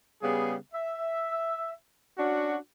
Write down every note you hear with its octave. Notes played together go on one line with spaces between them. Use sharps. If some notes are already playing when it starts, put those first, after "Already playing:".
C#3 G3 B3 G#4
E5
C#4 D4 F#4